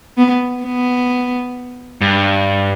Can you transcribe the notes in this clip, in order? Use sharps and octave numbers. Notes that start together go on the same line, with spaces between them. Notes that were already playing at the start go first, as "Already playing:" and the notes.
B3
B3
G2